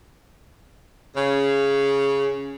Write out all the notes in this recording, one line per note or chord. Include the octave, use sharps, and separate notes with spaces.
C#3